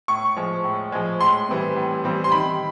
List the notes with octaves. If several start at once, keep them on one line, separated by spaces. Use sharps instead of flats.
A2 C#6
F3 G#3
A2
F3 G#3
A2 C6
E3 G3 C4
A2
E3 G3 C4
C6
D#3 B5